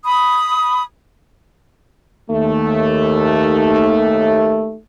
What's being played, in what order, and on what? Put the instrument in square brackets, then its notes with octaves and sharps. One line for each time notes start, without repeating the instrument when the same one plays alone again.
[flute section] B5 D#6
[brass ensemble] D#2 A3